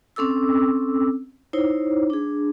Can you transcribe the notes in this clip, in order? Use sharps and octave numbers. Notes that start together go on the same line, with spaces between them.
C4 C#4 A4 D6 E6
D#4 E4 C5 C#5
D4 G#4